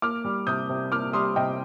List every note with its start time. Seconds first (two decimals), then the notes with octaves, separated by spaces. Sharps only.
0.02 A#3 D6 F6
0.24 G3
0.47 C3 D#6 G6
0.69 C3
0.92 A#3 D6 F6
1.13 G3 C6 D#6
1.36 C3 D#5 G5